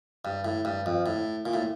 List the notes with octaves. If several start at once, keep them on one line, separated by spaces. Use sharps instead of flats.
G2
A2
G2
F2
A2
A#2
A2